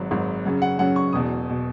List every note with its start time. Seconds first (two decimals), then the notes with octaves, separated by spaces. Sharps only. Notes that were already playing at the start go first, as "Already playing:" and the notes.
Already playing: G#1 G#2 F#3
0.11 G#1 G#2 F#3
0.45 F#2 C#3 F#3 C#4
0.62 F#5
0.79 F#2 C#3 F#3 C#4 F#5
0.96 C#6
1.13 E1 E2 B2 D#6
1.50 B2